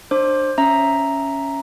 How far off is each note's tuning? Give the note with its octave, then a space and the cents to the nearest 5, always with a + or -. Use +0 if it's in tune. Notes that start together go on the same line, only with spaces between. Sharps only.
D4 +25 C5 +20 D6 +0
C#4 +0 E5 +5 A#5 +0